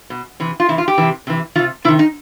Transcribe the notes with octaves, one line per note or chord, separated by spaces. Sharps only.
B2
C3 E3
F4
C3 E3 E4
F4
G4
C3 E3
C3 E3
C3 D#3 F4
C3 D#3 E4
D#4